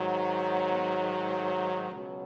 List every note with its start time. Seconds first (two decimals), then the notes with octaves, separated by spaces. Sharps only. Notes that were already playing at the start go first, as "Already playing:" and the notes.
Already playing: G#2 D#3 F#3
0.72 B3
1.01 G#3
1.31 A3
1.91 C#2 B2 F#3